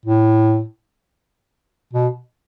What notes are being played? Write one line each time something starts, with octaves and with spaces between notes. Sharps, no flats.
A2
B2